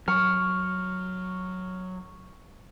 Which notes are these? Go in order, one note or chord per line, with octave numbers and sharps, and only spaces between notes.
F#3 C#6 F6